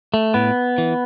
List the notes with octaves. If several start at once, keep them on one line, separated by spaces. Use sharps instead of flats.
A3
A2 B3
E3